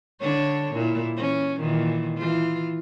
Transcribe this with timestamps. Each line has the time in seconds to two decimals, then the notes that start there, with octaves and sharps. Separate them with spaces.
0.21 D3 D4 C#5
0.73 A#2 E4
1.17 E3 C#4
1.59 A#2 D#3 E3
2.17 E3 F4